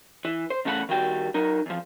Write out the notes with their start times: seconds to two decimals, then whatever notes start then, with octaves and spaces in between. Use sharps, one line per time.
0.25 E3
0.50 C5
0.65 E2 C#3 A3 F#4 F#5 B5
0.89 D#3 G3 F#4 G5
1.34 F#3 D#4 A#4
1.66 E2 F3